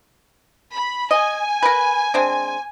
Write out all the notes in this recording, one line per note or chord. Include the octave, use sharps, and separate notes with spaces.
B5
D#5 G#5
A#4 B4
G#3 C4 D4